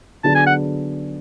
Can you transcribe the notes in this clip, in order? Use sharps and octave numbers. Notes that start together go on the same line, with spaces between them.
D3 F#3 B3 D4 G#4 A5
G#5
F#5